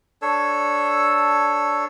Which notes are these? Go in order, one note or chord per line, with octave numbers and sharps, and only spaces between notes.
D4 A4 C#5 E6